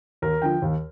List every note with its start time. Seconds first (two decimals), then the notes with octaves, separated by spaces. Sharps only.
0.22 D#2 A#4
0.42 D3 F3 G5
0.62 D#2